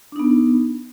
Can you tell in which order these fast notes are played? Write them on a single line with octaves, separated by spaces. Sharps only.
D4 D#4 B3